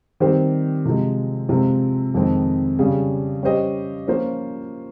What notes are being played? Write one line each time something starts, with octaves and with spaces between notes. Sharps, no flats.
D#3 G3 C4 G4 C5
C3 F3 G#3
C3 F3 G#3 C4 F4
F2 D#3 G#3 C4
C#3 G3 C#4 G#4
G3 C#4 G4 C5 D#5
F3 A#3 C#4 F4 C5